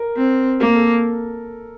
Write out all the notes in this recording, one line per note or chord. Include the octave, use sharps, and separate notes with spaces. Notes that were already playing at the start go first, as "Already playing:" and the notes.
Already playing: A#4
C4
A#3 A#4
A4